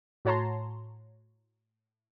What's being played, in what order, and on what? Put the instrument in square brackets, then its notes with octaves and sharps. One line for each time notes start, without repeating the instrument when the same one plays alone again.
[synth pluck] A2 F#4 C#5 A5 A#5 C6